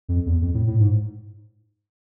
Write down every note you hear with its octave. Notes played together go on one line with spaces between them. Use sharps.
F2
E2
F2
A2
A2
G#2